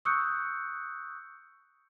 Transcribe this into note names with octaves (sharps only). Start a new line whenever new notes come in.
C#6 D#6 E6 F#6 G6 C#7